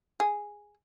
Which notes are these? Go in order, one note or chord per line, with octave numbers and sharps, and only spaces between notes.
G#4